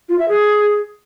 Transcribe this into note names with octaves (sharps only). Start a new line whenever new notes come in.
F4
E5
G#4